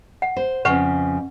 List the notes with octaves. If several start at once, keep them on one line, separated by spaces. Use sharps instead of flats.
F#5
C5
F2 C#3 B4 F#5 C#6